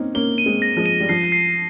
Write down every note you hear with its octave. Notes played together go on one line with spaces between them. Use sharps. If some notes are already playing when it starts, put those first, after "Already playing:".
Already playing: A#3 C4 C#4 D#4
A#3 C#4 G7
D#7
G#3 C4
A#6
F3 G#3
D#7
G3
F3 C7
C7